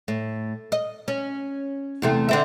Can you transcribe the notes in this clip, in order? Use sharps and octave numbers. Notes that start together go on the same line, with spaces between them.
A2
D#5
C#4
E2 C3 A3
D3 C4 E5